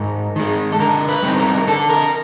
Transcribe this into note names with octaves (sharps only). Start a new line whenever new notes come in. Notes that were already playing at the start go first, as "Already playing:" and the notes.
Already playing: G#2 A#4
D#3 G#3
A4
D3 A#4
B4
G3 C4 D#4
A#4
D3 A4
A#4